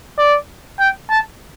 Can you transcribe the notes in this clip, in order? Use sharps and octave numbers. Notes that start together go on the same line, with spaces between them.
D5
G5
A5